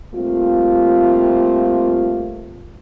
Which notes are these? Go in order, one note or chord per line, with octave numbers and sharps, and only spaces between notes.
G3 A3 A#3 C4 F4